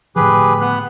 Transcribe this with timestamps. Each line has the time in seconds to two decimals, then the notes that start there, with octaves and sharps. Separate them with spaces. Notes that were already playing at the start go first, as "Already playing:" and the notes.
0.16 A2 D3 F3 G4 G#4 B4
0.61 B3 F#6